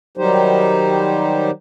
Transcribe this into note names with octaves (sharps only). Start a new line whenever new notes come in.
D#3 F#3 G3 D#4 G4 C5